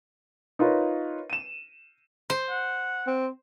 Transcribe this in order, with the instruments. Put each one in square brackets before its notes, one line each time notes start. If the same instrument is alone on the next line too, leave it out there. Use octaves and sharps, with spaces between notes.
[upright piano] D#4 F4 A#4 B4 C#5
D#7 E7
[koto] C5
[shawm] F#5
[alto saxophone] C4